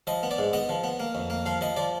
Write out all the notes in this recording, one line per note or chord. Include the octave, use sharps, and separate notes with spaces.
F3 D#5
B3
D5
G#2
B3 D#5
F3
B3
A#3
F2
A#3
F3 F5
F3 D#5
F3 D5